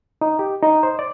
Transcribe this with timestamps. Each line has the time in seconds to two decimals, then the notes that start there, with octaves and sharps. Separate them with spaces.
0.21 D#4
0.39 G4
0.62 D#4
0.83 C5
0.99 D5